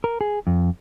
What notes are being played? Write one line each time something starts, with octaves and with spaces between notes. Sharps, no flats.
A#4
G#4
F2